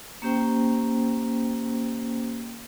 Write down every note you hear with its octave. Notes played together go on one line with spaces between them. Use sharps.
A#3 C#4 G4 C5 G5